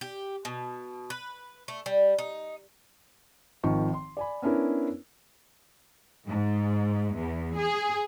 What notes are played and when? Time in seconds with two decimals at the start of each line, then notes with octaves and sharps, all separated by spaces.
0.01 G4
0.45 B2
1.10 B4
1.68 A3
1.86 G3
2.19 D#4
3.63 G#1 D#3 F3 C#6
3.93 C6
4.17 D5 G#5 B5
4.42 B3 C#4 D4 E4 A#4
6.28 G#2
7.17 E2
7.58 G#4